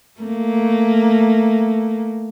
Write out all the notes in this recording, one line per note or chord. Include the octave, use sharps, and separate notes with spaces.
A3 A#3